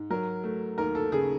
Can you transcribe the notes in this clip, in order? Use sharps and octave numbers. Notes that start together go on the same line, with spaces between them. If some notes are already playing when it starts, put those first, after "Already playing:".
Already playing: G#2
F#3 A#4
A3
D#2 A#4
A4
C#3 G#4